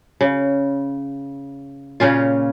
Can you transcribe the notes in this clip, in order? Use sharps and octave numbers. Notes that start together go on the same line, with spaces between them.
C#3
A#2 C#3 C#4 F4